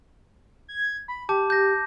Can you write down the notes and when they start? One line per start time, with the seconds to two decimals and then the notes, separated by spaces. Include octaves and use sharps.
0.68 G#6
1.08 B5
1.29 G4 A5 D6 G6
1.50 G6 A#6